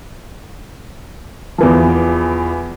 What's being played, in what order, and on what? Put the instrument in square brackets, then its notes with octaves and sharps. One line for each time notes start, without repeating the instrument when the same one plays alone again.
[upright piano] E2 E3 F3